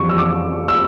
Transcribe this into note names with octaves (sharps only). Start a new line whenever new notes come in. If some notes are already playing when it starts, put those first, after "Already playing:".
Already playing: F2 E3 G3 C#6
E6
D6
E6